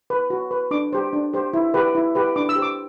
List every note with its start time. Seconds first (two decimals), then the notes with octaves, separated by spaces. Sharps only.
0.10 B4
0.30 F#4
0.51 B4
0.71 D4 D6
0.93 G4 C5
1.13 D4
1.33 G4 C5
1.53 E4
1.74 G4 B4
1.95 E4
2.15 G4 B4
2.36 D4 D6
2.49 E6
2.56 G4 C5
2.62 D6